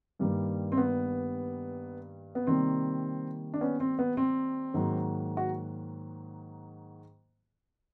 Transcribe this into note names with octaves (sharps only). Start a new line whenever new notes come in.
G2 D#3 G3 A#3
C4
B3
B3
C3 D#3 G3 A#3 C4
D4
B3 C#4
C4
B3
C4
G#2 D#3 F#3 A#3
F#4